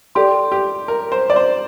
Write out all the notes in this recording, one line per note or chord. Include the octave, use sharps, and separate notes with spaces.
G4 A4 D5 G5 C6
G4
A#4
C5
D5
C5